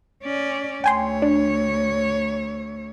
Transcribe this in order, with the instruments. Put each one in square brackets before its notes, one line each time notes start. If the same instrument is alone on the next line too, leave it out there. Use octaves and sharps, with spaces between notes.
[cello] C#4 D5
[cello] D2 C#5 [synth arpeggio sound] G5 G#5 C6
[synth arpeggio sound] D4